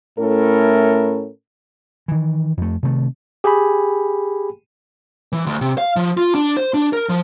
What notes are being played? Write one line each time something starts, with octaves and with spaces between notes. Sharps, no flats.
A2 A3 C#4 E4 A4 A#4
D#3 E3
F2 A3
C3 D#3 F3 A3
G4 G#4 G5 G#5 B5
E3
D2
C3
F5
F3
F4
D4
C5
D4
A#4
F3